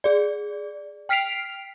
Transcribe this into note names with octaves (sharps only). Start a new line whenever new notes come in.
G#4 D5
G5 F6 B6 C7 D7 F7